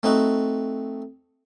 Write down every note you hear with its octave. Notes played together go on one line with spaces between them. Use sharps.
A3 C4 D#4 F#4